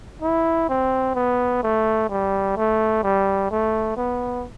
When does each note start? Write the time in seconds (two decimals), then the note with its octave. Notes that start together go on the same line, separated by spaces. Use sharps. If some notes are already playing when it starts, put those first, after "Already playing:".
0.22 E4
0.69 C4
1.15 B3
1.63 A3
2.09 G3
2.57 A3
3.03 G3
3.51 A3
3.97 B3